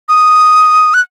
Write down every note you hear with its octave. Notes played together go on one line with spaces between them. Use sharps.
D#6
F#6